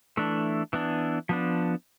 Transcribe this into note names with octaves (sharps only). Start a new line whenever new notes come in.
E3 A3 D4
E3 B3 D4
F3 B3 D4